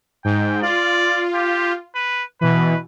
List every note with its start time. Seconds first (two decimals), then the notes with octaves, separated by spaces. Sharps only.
0.25 G#2 G5
0.62 F4 D5
1.34 G4
1.95 B4
2.41 B2 E3 B4